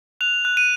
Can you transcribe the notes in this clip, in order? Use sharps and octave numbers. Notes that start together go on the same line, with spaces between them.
F#6 F7
F#6
D#7